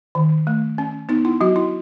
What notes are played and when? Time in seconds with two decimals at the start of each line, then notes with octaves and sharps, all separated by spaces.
0.15 D#3
0.47 A3
0.78 C#4
1.09 B3 D#4
1.25 E4
1.41 F#3 F#4
1.56 E4